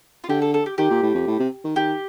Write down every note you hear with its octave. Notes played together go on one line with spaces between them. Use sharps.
F4
D3 G4
A4
A4
G4
D#3 G4
A#2
A2
F2
A2
C3
D#3
D#3 G4